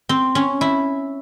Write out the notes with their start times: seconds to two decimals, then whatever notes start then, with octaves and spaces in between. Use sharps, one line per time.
0.09 C4
0.35 C#4
0.61 E4